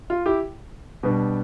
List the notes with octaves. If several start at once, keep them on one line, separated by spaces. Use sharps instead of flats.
F4
E4 G4
B2 G3 B3 D4